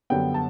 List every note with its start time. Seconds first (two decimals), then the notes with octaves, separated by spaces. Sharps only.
0.10 F#2 D3 G3 B3 G5
0.34 A5